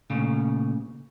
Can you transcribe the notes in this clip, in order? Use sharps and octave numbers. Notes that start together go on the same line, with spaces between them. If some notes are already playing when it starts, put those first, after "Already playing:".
A#2 C#3 A3